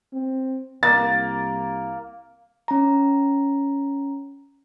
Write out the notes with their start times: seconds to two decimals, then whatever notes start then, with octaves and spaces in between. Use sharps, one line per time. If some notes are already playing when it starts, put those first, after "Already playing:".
0.13 C4
0.83 C2 A#3 A6
2.68 C#4 A#5